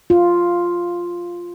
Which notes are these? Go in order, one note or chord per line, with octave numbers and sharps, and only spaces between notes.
F4